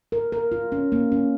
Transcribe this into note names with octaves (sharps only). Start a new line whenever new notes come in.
A#4
A#4
F4
C#4
A#3
C#4